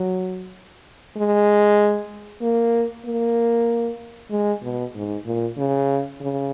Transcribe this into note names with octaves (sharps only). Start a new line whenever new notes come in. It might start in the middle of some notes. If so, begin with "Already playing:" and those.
Already playing: F#3
G#3
A#3
A#3
G#3
B2
G#2
A#2
C#3
C#3